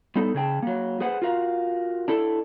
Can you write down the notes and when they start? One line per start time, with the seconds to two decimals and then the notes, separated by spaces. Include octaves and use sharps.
0.16 G2 B3 D#4 A4
0.34 C#3 G#4 G5 A5
0.63 F#3 A#3
1.00 G#4 B4 C5 F#5
1.22 F4 F#4 A#4 F5
2.08 D4 E4 A4